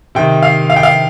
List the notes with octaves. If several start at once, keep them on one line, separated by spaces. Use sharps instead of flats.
C3 D#3 G5
F5
F5
G5
F5